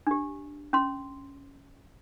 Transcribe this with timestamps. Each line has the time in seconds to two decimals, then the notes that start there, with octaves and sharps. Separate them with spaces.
0.07 D4 G4
0.73 C#4 C6